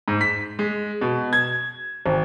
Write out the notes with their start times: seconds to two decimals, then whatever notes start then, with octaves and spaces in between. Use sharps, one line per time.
0.08 G#2
0.21 B6
0.59 G#3
1.01 B2
1.33 G#6
2.06 G#1